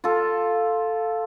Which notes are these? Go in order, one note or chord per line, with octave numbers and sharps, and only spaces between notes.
F4 A4